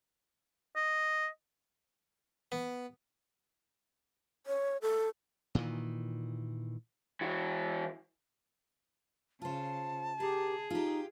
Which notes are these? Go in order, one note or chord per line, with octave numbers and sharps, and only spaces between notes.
D#5
B3
C#5
A4
A#2 D#3 E3
E3 F#4
C#3 F4 C5 A5
G4 G#4 A#4
D#4 F4 G4